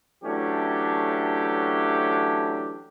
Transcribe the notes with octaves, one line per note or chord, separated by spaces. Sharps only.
E3 F#3 A3 C#4 D4 G4